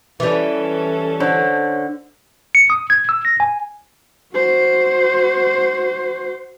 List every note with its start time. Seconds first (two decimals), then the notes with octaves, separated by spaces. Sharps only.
0.20 E3 G3 C#4 A4
1.20 D3 C5 C#5
2.55 C#7
2.70 D#6
2.90 G#6
3.09 E6
3.25 A#6
3.40 G#5
4.33 F#4 C5